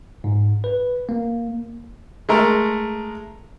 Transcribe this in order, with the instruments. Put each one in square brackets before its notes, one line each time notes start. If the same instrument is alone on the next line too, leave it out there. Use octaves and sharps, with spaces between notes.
[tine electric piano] G#2
B4
A#3
[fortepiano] G#3 A3 A#4